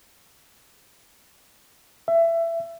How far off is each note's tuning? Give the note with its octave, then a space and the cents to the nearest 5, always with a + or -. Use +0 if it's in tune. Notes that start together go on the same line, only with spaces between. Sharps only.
E5 +20